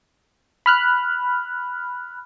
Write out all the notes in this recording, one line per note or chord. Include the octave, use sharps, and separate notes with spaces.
B5 F6 F#6